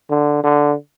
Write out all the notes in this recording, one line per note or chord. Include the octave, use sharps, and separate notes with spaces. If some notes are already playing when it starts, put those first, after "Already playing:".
D3
D3